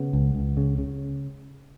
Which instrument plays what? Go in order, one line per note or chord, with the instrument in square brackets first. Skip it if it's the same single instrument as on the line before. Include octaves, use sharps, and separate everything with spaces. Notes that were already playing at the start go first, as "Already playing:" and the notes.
Already playing: [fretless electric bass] C#3 B3
C#2
C#2
C#3
C#3